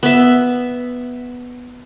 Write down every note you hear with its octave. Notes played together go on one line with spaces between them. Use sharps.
B3 E5